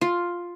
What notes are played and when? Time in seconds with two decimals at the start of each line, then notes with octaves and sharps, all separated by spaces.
0.01 F4